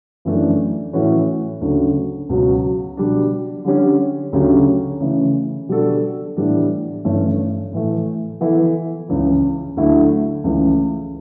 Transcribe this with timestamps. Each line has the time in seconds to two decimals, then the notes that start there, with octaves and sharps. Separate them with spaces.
0.25 F#2 E3 A3 D4
0.93 A2 E3 A3 C#4 F#4
1.61 D2 C#3 F#3
2.29 C#2 B2 F#3
2.97 B2 G3 D4
3.64 D3 G3 C#4 G4
4.32 D2 C#3 F#3 C#4 G4
5.01 C#3 E3 A3
5.69 B2 G3 D4 F#4 A4
6.37 A2 E3 G3 B3 D4
7.05 G2 E3 A3 C#4
7.73 A2 E3 A3
8.41 E3 B3 E4 A4
9.09 C#2 C#3 E3
9.77 D2 D3 F#3 A3 E4
10.44 C#2 C#3 E3 A3